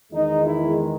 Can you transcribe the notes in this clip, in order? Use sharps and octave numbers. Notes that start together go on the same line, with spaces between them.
E2 D#3 G#3 D#4
E4